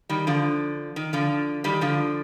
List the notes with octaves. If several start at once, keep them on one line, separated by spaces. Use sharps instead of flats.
D#3 G3
D3 F3
D#3
D3 F3
D#3 G3
D3 F3